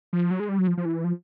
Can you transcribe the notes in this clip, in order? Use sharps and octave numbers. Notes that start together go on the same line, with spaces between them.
F3
F#3
G#3
G3
F#3
F3
F3
E3
F3